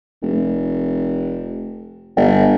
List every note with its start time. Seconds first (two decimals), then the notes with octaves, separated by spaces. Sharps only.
0.22 F1
2.17 G1